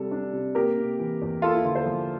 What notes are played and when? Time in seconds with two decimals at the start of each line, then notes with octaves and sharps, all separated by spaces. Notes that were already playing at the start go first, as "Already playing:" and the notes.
Already playing: C3 G3 A4
0.11 D4
0.33 C3
0.55 A#3 G4 A#4
0.78 C3
0.99 E3
1.21 E2
1.42 A#3 F4 A4
1.54 E4
1.64 D3 F4
1.75 A4 C5
1.86 F3